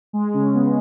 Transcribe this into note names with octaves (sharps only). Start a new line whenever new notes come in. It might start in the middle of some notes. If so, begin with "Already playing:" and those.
G#3
C#3
B3